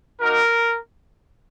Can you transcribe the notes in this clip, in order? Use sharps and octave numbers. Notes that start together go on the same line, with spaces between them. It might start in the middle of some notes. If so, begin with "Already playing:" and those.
A#3 D#4 F#4 A#4